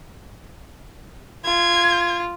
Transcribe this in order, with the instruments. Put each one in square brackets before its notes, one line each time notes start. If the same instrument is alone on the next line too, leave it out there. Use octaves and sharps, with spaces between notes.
[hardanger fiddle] F4 [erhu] G#6